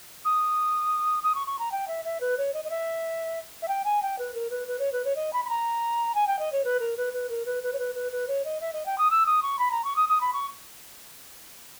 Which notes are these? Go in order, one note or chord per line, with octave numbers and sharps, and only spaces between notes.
D#6
D#6
C#6
C#6
A#5
G5
E5
E5
B4
C#5
D#5
D#5
E5
E5
G5
G#5
G5
B4
A#4
B4
B4
C#5
B4
C#5
D#5
B5
B5
A#5
G#5
G5
D#5
C#5
B4
A#4
B4
B4
A#4
B4
B4
C#5
B4
B4
B4
C#5
D#5
E5
D#5
G5
D#6
E6
D#6
C#6
B5
A#5
C#6
D#6
D#6
B5
C#6